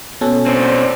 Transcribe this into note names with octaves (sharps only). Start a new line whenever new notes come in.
B2 C#4 A4
C4 D4